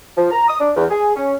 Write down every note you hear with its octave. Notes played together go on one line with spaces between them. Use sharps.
F3
A#5
D#6
D4
E2
G#4
C#4